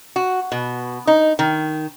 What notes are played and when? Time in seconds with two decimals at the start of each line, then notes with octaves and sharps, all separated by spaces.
0.16 F#4
0.52 B2
1.07 D#4
1.39 D#3